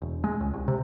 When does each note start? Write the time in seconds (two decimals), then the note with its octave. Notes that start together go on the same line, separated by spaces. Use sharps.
0.02 E1
0.24 G#3
0.40 C#2
0.54 C2
0.68 C3